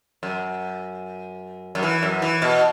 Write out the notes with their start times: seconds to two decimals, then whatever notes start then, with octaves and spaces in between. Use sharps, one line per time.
0.23 F#2
1.75 F#2
1.83 E3
2.03 F#2
2.22 E3
2.42 B2